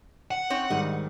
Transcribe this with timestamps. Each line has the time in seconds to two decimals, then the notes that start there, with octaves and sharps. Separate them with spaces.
0.31 F#5
0.50 C4 D#4 C#5
0.70 G#2 D#3 G3 D#4